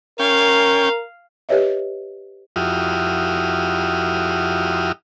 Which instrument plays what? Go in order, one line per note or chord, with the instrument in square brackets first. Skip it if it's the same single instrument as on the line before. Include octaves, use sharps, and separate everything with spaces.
[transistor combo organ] C#4 G5 [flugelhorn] A#4 [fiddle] F5
[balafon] G4 B4 C#5 D#5 E5
[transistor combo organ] F2 E4 F#4 G4 D#6 F6